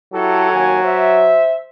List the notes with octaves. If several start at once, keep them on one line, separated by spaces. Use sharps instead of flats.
F#3 E4 G4 A4
D#2 F#4 G#5
C5 E5